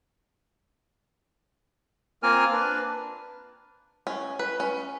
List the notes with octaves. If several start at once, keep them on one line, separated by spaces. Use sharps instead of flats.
A#3 C4 F4 A#4 G#5 F6
D4 B4
C#4
B4
C#4